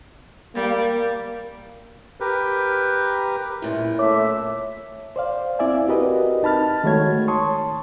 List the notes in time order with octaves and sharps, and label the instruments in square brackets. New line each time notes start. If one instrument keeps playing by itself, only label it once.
[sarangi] G3 [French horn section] A#3
[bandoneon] G4 A#4 B4
[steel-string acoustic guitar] F#2 A#2 [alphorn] E4
[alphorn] A3 [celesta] C#5 D6 [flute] E5
[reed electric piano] C5 D5 F5
C4 E4 D5 E5 G#5
C4 F#4 G4 A#4 B4 D#5
D#4 A5 B5 F6 A6
D#3 G#3 A3 F#4 C#5 G#6
C#5 A5 C6 C#6 D#6